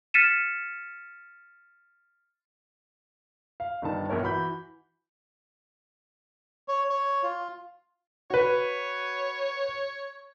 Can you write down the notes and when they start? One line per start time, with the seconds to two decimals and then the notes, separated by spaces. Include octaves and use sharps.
0.14 F6 A6 B6 C#7 D#7 E7
3.60 F5
3.82 G1 G2 D#3 A5
4.09 A#1 E2 A#4 C#5
4.22 E3 F#4 B5 G6
6.68 C#5
6.90 C#5
7.23 F4
8.30 F#4 B4 C#5